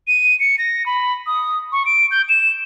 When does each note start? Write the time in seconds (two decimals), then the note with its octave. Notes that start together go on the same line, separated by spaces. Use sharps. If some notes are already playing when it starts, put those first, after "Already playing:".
0.07 D#7
0.40 C#7
0.58 A#6
0.86 B5
1.27 D#6
1.72 C#6
1.86 D7
2.11 G6
2.29 E7